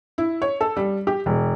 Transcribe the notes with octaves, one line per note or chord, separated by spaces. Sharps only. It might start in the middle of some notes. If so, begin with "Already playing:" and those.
E4
C#5
A4
G3
G4
E1